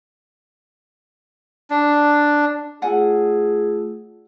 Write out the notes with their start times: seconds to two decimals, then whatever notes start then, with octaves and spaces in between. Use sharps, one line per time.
1.70 D4
2.82 A3 F4 G#4 D5 F#5 G#5 E6